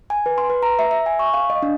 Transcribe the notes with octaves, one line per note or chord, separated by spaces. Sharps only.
G#5
B4
C6
B4
A#5
E5
E5
G#5
C#6
F5
D#5
D4